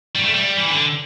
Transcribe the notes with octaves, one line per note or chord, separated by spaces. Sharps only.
G3
A3
G3
E3
D3